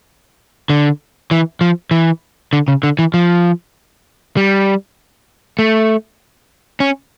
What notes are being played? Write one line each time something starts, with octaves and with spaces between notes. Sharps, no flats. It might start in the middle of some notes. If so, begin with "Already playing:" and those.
D3
E3
F3
E3
D3
C#3
D3
E3
F3
G3
A3
C#4